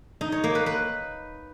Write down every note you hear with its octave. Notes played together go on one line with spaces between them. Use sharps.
D#4
C#5
A#3
B4
B4